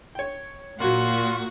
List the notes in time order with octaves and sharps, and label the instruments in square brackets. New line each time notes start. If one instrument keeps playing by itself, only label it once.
[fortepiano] C#5 G5
[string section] A#2 [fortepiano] F#3 A#3 [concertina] F4 [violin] F#4